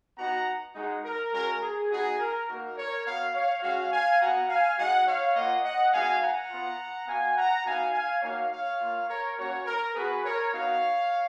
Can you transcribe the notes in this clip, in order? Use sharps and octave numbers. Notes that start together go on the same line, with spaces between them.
B3 D#4 F#4 F#5 A#5
G#3 D#4 F#4
A#4
G#3 C#4 F#4 A#4
G#4
B3 D#4 F#4 G#4
A#4
A#3 D#4 F#4 A#4
A#4 C#5
B3 F#4 C#5 F5
C#5 F5
G#3 C#4 F#4 C#5 F5
F5 G#5
B3 F#4 F#5 A#5
F5 G#5
G#3 D#4 F#4 D#5 F#5
C#5 F5
A#3 F4 D#5 F#5
D#5 F#5
G#3 B3 D#4 F#4 F5 G#5
F#5 A#5
B3 F4
B3 F#4 F5 G#5
F#5 A#5
B3 D#4 F#4 F5 G#5
F5 G#5
A#3 D#4 F#4 C#5 F5
C#5 F5
A#3 F4
A#4 C#5
A#3 C#4 F#4 A#4 C#5
A#4
B3 F#4 G#4 B4
A#4 C#5
B3 D#4 F#4 C#5 F5